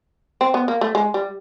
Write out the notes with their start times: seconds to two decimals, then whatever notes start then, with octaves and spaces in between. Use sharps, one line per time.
0.41 C4
0.54 B3
0.68 A#3
0.81 A3
0.95 G#3
1.14 G3